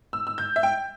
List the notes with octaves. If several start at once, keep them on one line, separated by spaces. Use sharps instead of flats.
E6
E6
G6
E5
G5